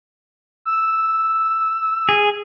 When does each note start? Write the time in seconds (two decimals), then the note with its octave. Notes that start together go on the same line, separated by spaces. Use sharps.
0.65 E6
2.09 G#4